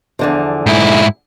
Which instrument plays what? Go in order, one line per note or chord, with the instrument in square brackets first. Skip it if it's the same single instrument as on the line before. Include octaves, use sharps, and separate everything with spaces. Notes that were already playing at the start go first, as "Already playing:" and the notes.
[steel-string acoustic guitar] E2 D3 F3
[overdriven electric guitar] G#2 E4